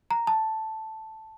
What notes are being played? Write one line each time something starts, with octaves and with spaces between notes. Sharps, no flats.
A#5
A5